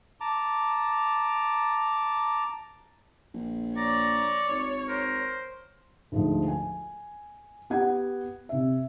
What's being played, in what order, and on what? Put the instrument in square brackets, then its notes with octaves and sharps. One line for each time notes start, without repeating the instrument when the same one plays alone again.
[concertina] A5 A#5 D6
[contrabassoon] A#1
[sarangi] C#5 [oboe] D5 [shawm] A#5
[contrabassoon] G#1 [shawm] C#6
[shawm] A#4 [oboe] C5
[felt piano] D2 G#2 F3
G#5
B3 G4 F#5 G#6
C3 E5